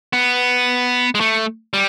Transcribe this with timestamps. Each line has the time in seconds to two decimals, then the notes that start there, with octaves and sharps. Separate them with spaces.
0.13 B3
1.15 G#3
1.20 A3
1.74 G3